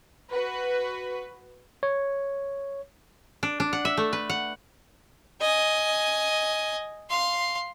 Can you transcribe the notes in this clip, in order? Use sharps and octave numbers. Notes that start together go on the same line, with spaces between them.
F#4 B4
C#5
D4
D4
F#5
E5
A3
B4
F#5
D#5 G#5
F5 C6